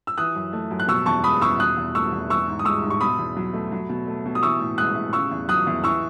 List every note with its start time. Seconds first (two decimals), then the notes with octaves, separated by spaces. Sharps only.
0.07 E6
0.18 E3 D#6 F#6
0.35 F#2
0.53 A3
0.71 F#2
0.80 F#6
0.88 B2 C#6 E6
1.06 E2 A5 C#6
1.24 G#3 B5 D#6
1.41 E2 C#6 E6
1.59 B2 D#6 F#6
1.77 E2
1.95 A3 C#6 E6
2.13 E2
2.30 E3 C#6 E6
2.48 G#2
2.59 D#6
2.65 G#3 C#6 E6
2.83 G#2
2.90 C#6
3.01 B2 B5 D#6
3.19 E2
3.37 F#3
3.53 A3
3.72 F#3
3.89 B2
4.07 A3
4.25 B2
4.35 D#6
4.43 E3 C#6 E6
4.61 A2
4.78 G#3 D#6 F#6
4.96 A2
5.13 C#3 C#6 E6
5.31 E2
5.49 F#3 D#6 F#6
5.67 E2
5.84 E3 C#6 E6